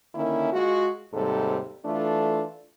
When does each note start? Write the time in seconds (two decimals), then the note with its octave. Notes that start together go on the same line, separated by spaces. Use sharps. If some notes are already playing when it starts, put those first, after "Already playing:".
0.15 D3 D#3 A#3 C#4 E4
0.53 G#3 F4 F#4
1.14 D#2 G#2 C3 G3 A4
1.86 E3 A3 D4 F4 A4